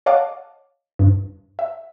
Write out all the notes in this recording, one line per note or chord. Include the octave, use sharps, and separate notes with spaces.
C#5 D#5 F5 F#5 A5 D6
G2
E5